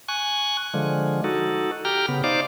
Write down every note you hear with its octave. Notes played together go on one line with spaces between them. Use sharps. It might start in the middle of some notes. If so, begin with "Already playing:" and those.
G#5 C#6 F#6
D3 F3 G#3
D#4 F#4 A4
G4 G5 A#5 F6
C#3 B3
D#4 C5 D5 F5 D6